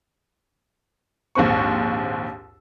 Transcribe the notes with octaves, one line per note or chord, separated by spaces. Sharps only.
A#1 D#2 G#2 C4 C#6